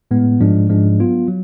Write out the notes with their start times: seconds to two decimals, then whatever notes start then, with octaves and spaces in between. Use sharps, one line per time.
0.11 A2 G#3 B3
0.40 G#2 F3 G#3 D4
0.69 G#2 F3 G#3 D4
1.00 F#3 B3 F4
1.28 F#3